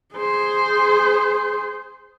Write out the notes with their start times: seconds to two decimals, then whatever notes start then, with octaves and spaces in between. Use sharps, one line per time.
0.15 G#4 C5